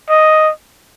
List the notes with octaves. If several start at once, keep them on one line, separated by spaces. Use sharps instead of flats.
D#5